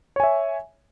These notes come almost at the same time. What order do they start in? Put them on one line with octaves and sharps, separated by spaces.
C#5 G#5 E5